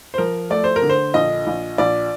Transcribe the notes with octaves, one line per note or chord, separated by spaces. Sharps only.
C5
F3 A#4
A3 D5
C5
A#4
D3
C5
A#1 D#5
A#1
A#1 D5